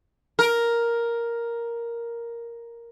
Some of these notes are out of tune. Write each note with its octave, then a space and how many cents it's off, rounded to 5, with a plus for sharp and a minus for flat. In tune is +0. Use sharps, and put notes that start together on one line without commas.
A#4 +5